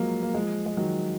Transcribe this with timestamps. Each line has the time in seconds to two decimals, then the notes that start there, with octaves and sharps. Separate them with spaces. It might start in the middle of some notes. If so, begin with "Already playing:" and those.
Already playing: F3 F#3 G#3 A#3
0.23 A#3
0.34 F3 G#3
0.66 G#3
0.77 D#3 F#3